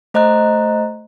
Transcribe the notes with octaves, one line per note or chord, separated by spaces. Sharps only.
A3 C5 D#5 A#5 F#6